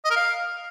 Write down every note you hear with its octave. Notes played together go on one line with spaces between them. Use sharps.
D#5
A#4
F5